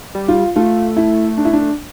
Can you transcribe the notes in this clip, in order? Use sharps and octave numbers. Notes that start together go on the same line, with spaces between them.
G3
F4
A3 F4
E4
D4
E4
D4